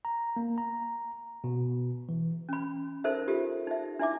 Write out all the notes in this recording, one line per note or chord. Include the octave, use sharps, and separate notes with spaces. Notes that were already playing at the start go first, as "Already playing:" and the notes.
A#5
A#3
A#5
B2
E3
C#4 B5
D#4 A4 A#4 C5 E5
F4 G4 A4
D#4 E5
D4 E4 E5 D6